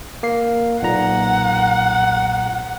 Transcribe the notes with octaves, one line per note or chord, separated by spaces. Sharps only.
A#3 C7
B1 A#2 F#5 A#5